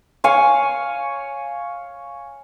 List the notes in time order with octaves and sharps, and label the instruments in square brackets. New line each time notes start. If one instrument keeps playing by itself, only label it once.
[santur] C#5 F5 G#5